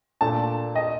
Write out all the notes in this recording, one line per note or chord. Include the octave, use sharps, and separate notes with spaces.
A#2 A3 D4 A5
D#5